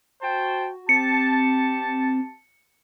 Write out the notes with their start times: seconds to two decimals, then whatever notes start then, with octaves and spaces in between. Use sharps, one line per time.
0.22 F#4 C5 G5 A5
0.89 C4 G4 A5 C#7